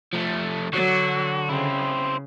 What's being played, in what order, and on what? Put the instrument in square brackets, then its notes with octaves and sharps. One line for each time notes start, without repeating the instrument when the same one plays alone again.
[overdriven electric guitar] F3 A3
[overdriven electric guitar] D3 [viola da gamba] F#3 [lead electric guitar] F#4
[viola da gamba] C#3 [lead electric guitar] C4 E4